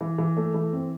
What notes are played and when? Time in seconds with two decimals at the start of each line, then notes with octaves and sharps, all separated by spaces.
0.01 E3
0.18 E3
0.37 A3
0.54 E3
0.73 C4